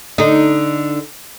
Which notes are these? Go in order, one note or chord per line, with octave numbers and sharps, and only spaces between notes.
D3 D#4